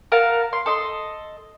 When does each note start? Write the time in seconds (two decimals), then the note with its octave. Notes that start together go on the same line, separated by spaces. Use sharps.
0.12 A#4 F5 F#5 A5
0.53 C6
0.66 A4 D#5 C6